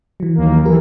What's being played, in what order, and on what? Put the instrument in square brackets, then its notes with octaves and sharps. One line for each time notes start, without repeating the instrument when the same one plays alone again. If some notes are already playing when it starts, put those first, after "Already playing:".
[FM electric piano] E3 F#3
[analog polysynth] D#2 A#3
[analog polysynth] E3 [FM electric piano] G4 A#4